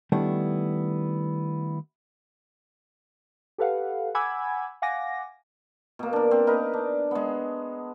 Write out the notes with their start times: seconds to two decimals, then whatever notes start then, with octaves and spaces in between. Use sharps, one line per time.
0.12 D#3 G3 A3 B3 D4 E4
3.58 G4 A4 B4 F5 F#5
4.15 F#5 G#5 B5 D6 E6 G#6
4.82 F5 F#5 G#5 D6 A#6
5.99 B2 A#3
6.13 D4 A#4
6.31 C4
6.47 D#4 A#4 B4
6.74 D4
7.11 G#3 B3